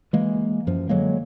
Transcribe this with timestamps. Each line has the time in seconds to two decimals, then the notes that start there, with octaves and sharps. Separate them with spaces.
0.13 E3 G#3 A#3
0.67 F#2 F3
0.89 D3 F#3 G#3 A#3